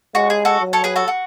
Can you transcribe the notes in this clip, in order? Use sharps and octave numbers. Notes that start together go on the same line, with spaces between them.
G#3 F#4
G#4
F#4 A4
F#3
A4 C#5
G#4 B4
F#4 A4
F#4